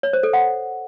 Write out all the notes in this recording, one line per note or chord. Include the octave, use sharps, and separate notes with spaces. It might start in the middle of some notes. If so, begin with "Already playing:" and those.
C#5
C5
A4
F#5